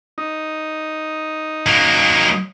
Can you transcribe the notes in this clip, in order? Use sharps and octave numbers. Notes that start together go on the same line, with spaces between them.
D#4
F#3 A#3